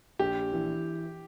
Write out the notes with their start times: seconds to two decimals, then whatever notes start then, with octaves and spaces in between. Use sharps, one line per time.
0.19 A#1 G4
0.53 E3